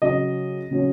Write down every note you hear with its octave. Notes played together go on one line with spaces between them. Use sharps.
C#3 F#3 C#4 D#5
C#3 F#3 C#4